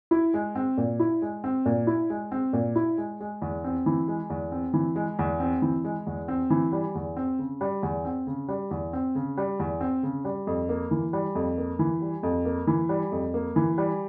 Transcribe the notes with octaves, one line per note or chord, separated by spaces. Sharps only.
E4
G#3
C4
A#2
E4
G#3
C4
A#2
E4
G#3
C4
A#2
E4
G#3
G#3
E2
C4
E3
G#3
E2
C4
E3
G#3
E2
C4
E3
G#3
E2
C4
E3
G3
E2
C4
C#3
G3
E2
C4
C#3
G3
E2
C4
C#3
G3
E2
C4
C#3
G3
F2
A#3
E3
G3
F2
A#3
E3
G3
F2
A#3
E3
G3
F2
A#3
E3
G3